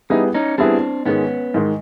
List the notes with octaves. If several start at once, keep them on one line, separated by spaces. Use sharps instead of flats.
G3 B3 D#4 E4 G#4 B4
C#4 D#4
G3 B3 C4 D4 E4 G#4 B4
G#2 D#3 G#3 B3 C#4
G#2 D#3 G#3